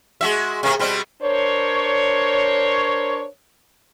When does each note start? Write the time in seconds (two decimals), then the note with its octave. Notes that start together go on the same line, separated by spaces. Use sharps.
0.21 G#3 F#4 E5
0.63 C3 A#3
0.79 B2 G3 C4
1.23 D4 A#4 C5 C#5